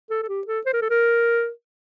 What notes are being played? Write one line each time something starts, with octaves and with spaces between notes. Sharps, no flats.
A4
A4
G4
A4
C5
A#4
A4
A#4